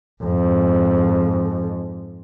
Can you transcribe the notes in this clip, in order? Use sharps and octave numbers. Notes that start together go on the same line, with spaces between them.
F2 G#2